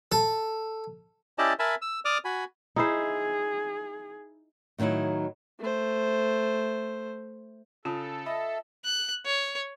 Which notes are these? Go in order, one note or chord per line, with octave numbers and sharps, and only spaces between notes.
A4
C#4 E4 G4 D5 D#5 A5
A#4 E5 G#5 A5 B5
E6
D5 D6 D#6 F6
F#4 G#5 B5
D#4 E4 G#4 C5
A2 D#3 F#3 D#4 E4
A3 C5
C#3 F4 A4 A5 D#6
D#5 E5 B5
F#6
C#5